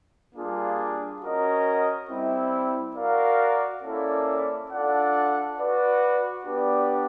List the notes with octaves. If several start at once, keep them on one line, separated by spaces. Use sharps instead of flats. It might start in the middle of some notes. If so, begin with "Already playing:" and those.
G3 A#3 D4 F4 G#4
C#4 F#4 A#4 D#5
G3 C4 E4
F#4 A#4 D5 F5
A#3 C#4 E4 A4 D5
D4 F4 A4 D5 F#5
F#4 B4 D5
B3 D4 G4 B4 D5